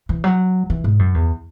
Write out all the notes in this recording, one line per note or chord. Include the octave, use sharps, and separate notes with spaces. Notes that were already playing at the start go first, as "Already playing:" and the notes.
E3
F#3
E3
G#2
F#2
E2